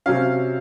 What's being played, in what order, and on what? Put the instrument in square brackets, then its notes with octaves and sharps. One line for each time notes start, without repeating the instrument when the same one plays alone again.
[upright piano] C3 F#3 C#4 F5